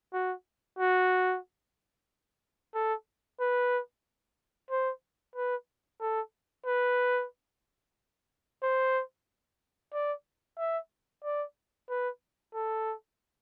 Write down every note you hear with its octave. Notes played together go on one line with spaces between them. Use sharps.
F#4
F#4
A4
B4
C5
B4
A4
B4
C5
D5
E5
D5
B4
A4